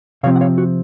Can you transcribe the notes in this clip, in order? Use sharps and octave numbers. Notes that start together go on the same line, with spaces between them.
C3 F3 C4 C#5 F5
F#5
C#5 F5
F#4